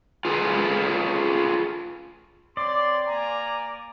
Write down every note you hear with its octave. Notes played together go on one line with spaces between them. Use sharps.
F4 G#4 A4 B4
C4 C#5 D5 C6
A#3 G#5 A#5